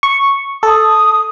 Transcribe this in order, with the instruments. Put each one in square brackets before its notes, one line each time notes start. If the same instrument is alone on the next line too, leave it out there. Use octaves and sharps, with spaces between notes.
[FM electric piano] C#6
[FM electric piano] A4 [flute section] D#6